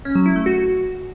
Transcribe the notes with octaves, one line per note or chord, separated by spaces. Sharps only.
C#4
F#3
E4
A3
F#4